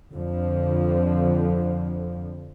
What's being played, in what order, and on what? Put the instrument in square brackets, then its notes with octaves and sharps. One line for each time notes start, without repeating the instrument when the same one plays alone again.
[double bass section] F2 D3 F3